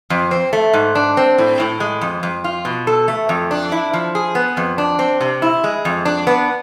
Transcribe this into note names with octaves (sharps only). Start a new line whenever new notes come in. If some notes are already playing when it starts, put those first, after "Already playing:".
F2
C4
A3
G#2
D4
C4
A2
A2
G#3
F2
F2
F4
B2
A4
A3
F2
D4
E4
F3
G#4
B3
F2
D4
C4
C3
E4
G#3
F2
D4
B3